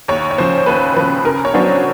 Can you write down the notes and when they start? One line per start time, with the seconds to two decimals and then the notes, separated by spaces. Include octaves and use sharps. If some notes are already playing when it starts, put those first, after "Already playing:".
0.08 D#2 C#5
0.31 C#5
0.38 C#3 F3 C5
0.66 D#2 B4
0.97 C#3 F3 B4
1.25 C#3 A#4
1.45 C#5
1.54 F#3 B3 D4 C5